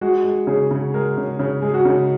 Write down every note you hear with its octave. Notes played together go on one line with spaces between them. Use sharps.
G#3 F#4
G#3
C#3 G#4
C#3
G#3 A#4
C#3
C#3
G#3 G#4
F#4
C#3 D#4